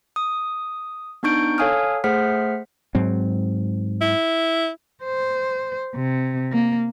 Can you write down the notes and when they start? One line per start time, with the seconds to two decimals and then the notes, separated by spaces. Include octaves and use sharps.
0.16 D#6
1.23 B3 D4 D#4 C#6 G6 D7
1.58 A4 C#5 F5 G#5 D#6 F6
2.04 A3 G#4 C5 F#5 F6 B6
2.95 G#2 F#3 C4
4.01 E4
5.04 C5
5.96 C3
6.52 A#3